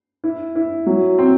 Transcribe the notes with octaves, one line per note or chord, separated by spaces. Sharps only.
E4
E4
F#3
C4